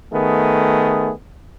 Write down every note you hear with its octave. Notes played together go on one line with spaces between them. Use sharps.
D#3 A3 B3 G#4